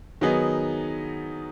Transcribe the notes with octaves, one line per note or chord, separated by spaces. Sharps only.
D#3 F#3 B3 D#4 G#4